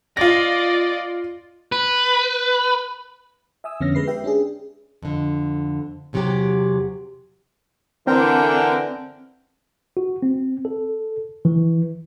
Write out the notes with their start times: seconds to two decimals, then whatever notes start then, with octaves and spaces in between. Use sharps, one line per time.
0.17 F4 D5 D#5 A#6
1.72 B4
3.64 E5 G#5 D#6 E6
3.80 F2 D3 B3 C#4 F6 A#6
3.95 G#3 B4 C7
4.07 G4 B4 E5 G5
4.24 C#4 D4 G#4
5.03 F2 D3
6.13 E2 C3 F#3 F#4 G4
8.07 D3 E3 C4 A#4 G5
9.97 F#4
10.22 C4
10.65 A4
11.45 E3